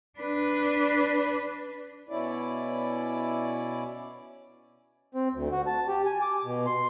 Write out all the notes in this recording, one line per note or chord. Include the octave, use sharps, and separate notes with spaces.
D4 B4
B2 C#4 E4 D5
C4
D2
F#4
A5
G4
G#5
D6
B2
C6